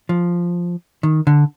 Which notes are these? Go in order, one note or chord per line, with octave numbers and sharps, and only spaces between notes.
F3
D#3
D3